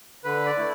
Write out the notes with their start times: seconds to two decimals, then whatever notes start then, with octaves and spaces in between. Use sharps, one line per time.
0.24 D3 B4
0.46 D5
0.58 A3 E4